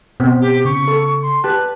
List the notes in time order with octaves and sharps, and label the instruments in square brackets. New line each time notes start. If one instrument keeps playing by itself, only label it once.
[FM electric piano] B2 [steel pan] B3 C4
[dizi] G4
[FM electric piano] C#3 [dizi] C#6
[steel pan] A4
[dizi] C6
[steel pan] G4 A5 [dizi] B4 [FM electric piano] F#6